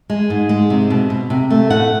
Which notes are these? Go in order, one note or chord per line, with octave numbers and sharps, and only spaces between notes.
G#3
G#2
G#3
C3
B2
B2
C3
A3
A2 F#5